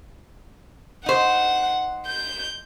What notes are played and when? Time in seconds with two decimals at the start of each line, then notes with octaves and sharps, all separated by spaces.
1.06 D#4 C5 F#5
2.07 G6